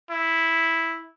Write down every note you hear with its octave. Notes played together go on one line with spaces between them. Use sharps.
E4